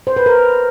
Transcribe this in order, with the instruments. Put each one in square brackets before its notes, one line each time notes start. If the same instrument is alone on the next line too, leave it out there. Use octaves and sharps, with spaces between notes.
[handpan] C5
B4
A#4